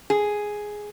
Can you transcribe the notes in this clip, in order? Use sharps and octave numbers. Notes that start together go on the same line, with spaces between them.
G#4